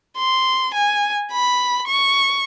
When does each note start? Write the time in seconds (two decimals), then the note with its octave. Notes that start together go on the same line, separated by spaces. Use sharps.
0.17 C6
0.74 G#5
1.32 B5
1.87 C#6